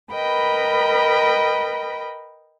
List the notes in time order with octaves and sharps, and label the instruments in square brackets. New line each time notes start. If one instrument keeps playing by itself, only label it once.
[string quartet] A#4 B4 D#5 G5 B5